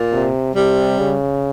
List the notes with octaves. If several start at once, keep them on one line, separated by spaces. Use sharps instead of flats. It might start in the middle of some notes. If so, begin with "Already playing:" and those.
Already playing: A#2
C3
C3 G3
C#3